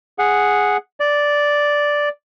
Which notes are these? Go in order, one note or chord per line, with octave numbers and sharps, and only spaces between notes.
G#4 F#5
D5